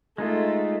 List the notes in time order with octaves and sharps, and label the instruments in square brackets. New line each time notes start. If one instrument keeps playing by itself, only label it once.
[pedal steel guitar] G#3 D#4 F4 [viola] A3